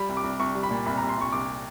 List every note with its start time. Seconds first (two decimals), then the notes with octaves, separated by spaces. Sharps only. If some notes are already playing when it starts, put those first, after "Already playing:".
Already playing: G3 B5
0.09 C2
0.17 D6
0.24 C2
0.40 C2 C#6
0.55 G3
0.63 B5
0.71 A#2
0.86 C2 B5
0.97 A#5
1.02 C2
1.09 C6
1.17 C2 C#6
1.33 C2 D6